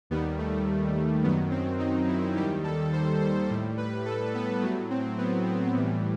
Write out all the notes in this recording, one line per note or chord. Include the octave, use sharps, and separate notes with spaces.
D#2 D#3 G3 B3
A3
F#2 D#3 F#3 B3
C4
D#4
E4
D#2 D#3 G3 G4
A4
C5
C5
A2 G3
B4
A4
B3
A2 F#3 A3
C4
B3
C4
A2 E3 G3